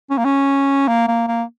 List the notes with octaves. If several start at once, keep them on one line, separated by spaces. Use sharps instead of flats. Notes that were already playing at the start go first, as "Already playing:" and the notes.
C#4
A#3
C#4
A#3
A#3
A#3